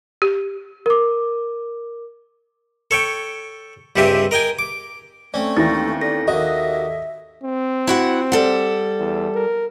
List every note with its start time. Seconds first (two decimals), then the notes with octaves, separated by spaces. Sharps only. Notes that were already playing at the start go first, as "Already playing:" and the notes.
0.22 G4
0.86 A#4 D6
2.91 A4 C#5 G5
3.96 C#2 G2 C3 C4 G4 E5
4.31 A#4 D#5 G5 G#5
4.59 D6
5.34 A3 C4 C#4 D5
5.57 D#2 E3 A6 A#6
6.01 A4 D5 A#6
6.28 D#2 F#4 D#5 E5
7.44 C4
7.87 E4 F#4 F#5
8.32 G3 A4 F#5
8.99 E2
9.35 A#4